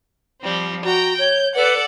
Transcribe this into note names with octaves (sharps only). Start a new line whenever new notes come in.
F3 G3 C4
F#4 G5 A#5
C#5 G6
A4 B4 D5 F#5